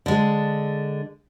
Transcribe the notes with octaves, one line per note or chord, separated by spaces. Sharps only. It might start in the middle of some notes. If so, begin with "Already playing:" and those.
D3 G#3